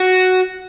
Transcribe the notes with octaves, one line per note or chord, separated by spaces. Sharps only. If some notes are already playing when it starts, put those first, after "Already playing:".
Already playing: F#4